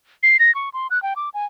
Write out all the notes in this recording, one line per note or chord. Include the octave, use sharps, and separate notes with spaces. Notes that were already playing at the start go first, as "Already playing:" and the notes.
C7
A#6
C#6
C6
F#6
G5
D6
G#5